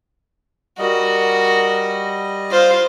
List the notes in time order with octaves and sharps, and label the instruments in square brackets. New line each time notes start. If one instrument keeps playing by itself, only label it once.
[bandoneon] G3 D#5 [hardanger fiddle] F#4 [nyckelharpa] A#4
[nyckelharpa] F4 F5 [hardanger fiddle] C5